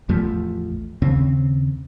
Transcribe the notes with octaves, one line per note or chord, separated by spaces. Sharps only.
A1 E2 F3 A3
D#2 C#3 C4